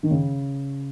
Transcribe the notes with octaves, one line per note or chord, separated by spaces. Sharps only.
D#3
C#3